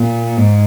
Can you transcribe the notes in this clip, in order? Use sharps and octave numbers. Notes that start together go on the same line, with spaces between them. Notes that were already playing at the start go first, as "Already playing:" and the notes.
Already playing: A#2
G#2